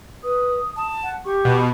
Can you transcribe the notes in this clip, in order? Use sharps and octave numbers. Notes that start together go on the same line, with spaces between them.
B4 D#6
A5
F#5
G4 C#6
B2